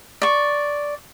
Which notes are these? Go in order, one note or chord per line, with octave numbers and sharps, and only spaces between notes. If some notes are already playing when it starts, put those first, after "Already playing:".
D5 C#6